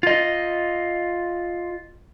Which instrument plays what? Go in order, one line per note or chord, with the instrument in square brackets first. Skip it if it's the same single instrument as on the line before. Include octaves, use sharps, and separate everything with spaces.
[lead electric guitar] F4 D#5